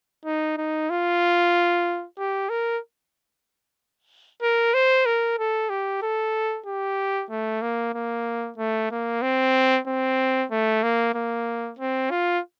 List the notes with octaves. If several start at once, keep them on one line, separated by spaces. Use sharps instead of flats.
D#4
D#4
F4
G4
A#4
A#4
C5
A#4
A4
G4
A4
G4
A3
A#3
A#3
A3
A#3
C4
C4
A3
A#3
A#3
C4
F4